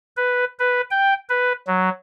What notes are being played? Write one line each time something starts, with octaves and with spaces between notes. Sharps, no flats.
B4
B4
G5
B4
F#3